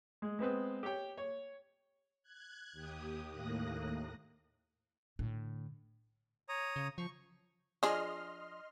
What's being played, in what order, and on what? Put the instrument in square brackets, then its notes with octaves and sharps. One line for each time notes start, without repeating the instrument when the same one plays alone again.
[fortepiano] G#3
G#3 B3 C4 B4
G4 C#5 G5
C#5
[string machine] F#6 G#6
D#2 G4 D#6
D#2 A2 A#3 D#6 F#6 A#6
[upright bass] A2 D3
[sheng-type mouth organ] C#5 A#5 D#6
[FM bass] C#3
[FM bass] F3 [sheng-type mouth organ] C#6
[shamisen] F3 D4 G#4 [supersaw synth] D#5 C6 F6